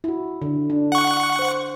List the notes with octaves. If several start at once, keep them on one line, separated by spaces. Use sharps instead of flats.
E4 F#4
D3
D4
F#5 C#6
C5